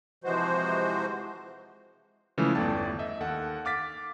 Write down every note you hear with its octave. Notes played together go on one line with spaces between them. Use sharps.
C3 E3 F3 G#3 F#4 C5
C#3 E3 F3 G#3 A3
G1 E2 A3 D5 G5 A5
D#5 E5
D#2 A4 F#5
F5 D6 A6 B6